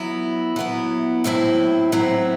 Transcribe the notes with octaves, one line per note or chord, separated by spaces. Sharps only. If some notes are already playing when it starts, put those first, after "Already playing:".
Already playing: F#3 B3 E4
F#3 B3 E4
A2 F#3 C4 E4
A2 F#3 C4 E4